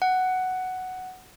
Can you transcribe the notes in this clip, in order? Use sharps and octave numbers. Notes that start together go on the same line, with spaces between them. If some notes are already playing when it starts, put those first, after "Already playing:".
F#5